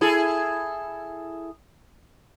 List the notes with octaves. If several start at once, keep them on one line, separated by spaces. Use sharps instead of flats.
E4 G#4 A4